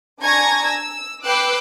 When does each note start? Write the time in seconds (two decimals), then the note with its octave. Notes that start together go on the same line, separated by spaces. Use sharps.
0.23 D4 G#5 A#5 C#6 G#6 A#6
0.67 E6
1.25 B4 G5 D6 E6 F#6 C7